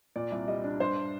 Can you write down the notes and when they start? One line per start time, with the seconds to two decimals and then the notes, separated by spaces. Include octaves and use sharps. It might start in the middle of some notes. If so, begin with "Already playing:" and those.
0.16 A#2 D5
0.32 C2
0.48 G3 D#5
0.64 D4
0.80 G2 C5